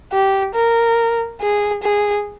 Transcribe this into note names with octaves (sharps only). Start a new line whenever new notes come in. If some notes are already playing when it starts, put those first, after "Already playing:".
G4
A#4
G#4
G#4